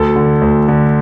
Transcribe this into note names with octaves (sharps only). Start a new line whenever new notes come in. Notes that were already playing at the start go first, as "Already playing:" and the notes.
Already playing: D2 A4
D3
D2
D3